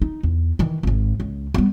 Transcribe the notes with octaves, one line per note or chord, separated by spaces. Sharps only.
D#4
E2
D#3 E3
G#1 G#2
C#2
G3 B3